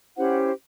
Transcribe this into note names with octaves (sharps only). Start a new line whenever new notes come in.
C#4 E4 G4 C5 F#5